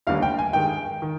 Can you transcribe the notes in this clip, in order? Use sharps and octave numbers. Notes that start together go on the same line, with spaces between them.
F1 D#2 D3 G3 F5
G5
G#5
G2 D#3 G#3 G5
D#3